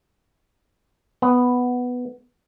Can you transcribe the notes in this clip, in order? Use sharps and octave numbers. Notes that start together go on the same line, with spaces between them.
B3